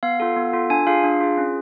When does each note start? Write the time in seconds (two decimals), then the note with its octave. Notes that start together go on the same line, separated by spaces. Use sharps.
0.03 B3 F5
0.20 F4 A4
0.36 B3
0.53 F4 A4
0.70 D4 G#5
0.87 F4 G#4 F5
1.04 D4
1.21 F4 G#4
1.38 C#4